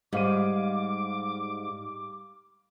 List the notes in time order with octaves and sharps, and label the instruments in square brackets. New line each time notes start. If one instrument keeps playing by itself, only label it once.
[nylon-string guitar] G#2 [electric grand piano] G3 F5 D#7 [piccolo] D6